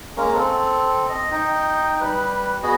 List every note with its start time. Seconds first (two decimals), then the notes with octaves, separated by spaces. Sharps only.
0.17 G#3 A#3 C#4 A#4
0.34 C4 A4
1.09 D#5
1.32 D#4 G5
2.00 G3 B4
2.63 B3 F#4 G#4 D#5